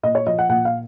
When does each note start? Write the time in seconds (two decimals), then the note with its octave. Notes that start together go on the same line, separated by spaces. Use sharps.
0.03 A#2 D#5
0.15 C#5
0.27 F3 D#5
0.39 F#5
0.49 A#2 F#5
0.65 F5